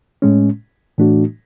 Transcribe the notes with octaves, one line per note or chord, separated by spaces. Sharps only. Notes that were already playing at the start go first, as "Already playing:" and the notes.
A2 G#3 C#4
A2 E3 A3 D4 F#4